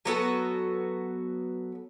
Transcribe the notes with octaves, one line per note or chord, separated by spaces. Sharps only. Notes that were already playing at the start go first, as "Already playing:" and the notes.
F#3 B3 F#4 A4